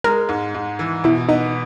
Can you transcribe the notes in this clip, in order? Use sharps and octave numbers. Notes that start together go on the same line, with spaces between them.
G#3 A#4
G#2
G#2
E3
B2 E4
B3 D#4